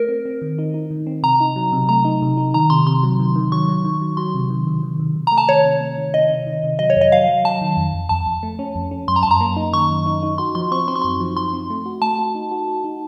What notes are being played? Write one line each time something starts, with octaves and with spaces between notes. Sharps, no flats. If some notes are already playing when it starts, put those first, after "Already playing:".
Already playing: A3 A#4
C4
C4
D#3
D#4
D#4
D#3
C4
C3 A#5
D#4
F#3
C3
A3 A#5
D#4
C3
D#4
D#3 A#5
C3 C6
C3 C6
F#3
D#3
D#3
F#3 C#6
F#3
D#3
F#3
F#3 C6
C3
D#3
C3
D#3
C3
C3
A3 A#5
A5
D#3 C#5
C3
A3
D#3
C3 D#5
C3
D#3
C3
F#3 D#5
C#5
F2
D#5
F#3 F5
F#3
F#3 A5
D#3
F2
F2
F2 A5
F2
A3
C#4
F2
C#4
F#2 C6
A#5
F#2 A5
A#5
A#3
D#4
D#3 C#6
F#2
D#4
D#4
F#4 C6
F3 C6
C4 C#6
C4 C6
C#6
F#2 C6
F3
F3 C6
C4
A3
F#4
A3 A5
F#4
D#4
F#4
F#4
D#4